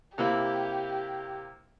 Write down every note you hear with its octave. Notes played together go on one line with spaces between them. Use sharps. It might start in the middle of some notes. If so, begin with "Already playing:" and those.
C3 A#3 E4 G4